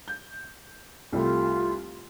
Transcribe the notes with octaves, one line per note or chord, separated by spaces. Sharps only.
G6
C2 G3 A3 F4